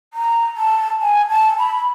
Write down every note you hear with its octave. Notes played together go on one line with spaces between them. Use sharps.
A#5
A5
G#5
A5
B5